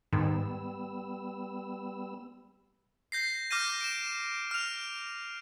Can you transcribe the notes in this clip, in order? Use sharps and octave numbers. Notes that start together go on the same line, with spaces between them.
G#2 D#3 G3 B3 E6
G6 A#6 C7
D6 F6 G6 A#6 D#7
D7 E7
F6 F7